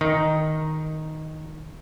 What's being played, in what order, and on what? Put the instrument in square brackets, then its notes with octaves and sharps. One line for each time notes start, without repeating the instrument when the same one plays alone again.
[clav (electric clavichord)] D#3 D#4